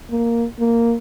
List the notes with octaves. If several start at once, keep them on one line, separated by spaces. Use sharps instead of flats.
A#3
A#3